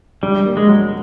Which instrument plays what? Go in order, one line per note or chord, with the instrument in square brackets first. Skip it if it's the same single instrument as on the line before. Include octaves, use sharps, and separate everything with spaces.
[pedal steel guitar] G3 [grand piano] D4
[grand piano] A#3
[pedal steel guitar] G#3
[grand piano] F#3